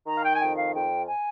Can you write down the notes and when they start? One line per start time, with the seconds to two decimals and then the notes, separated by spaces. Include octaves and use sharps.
0.06 D#3 A#5
0.17 F5
0.24 G5
0.36 G#5
0.40 F2 G5
0.57 F5
0.74 F2 G5
1.08 G#5